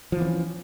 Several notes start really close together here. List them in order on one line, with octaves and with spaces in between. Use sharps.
F3 E3 B3 C#4